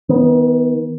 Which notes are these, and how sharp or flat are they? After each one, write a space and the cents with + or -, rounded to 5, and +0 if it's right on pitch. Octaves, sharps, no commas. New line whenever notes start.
D#3 +35 B3 +0